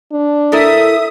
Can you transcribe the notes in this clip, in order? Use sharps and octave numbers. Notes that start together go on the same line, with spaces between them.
D4
E4 A4 A#4 E5 D#6